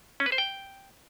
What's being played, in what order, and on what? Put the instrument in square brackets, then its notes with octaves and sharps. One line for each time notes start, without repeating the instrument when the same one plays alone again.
[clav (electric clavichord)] C#4
B4
C5
G5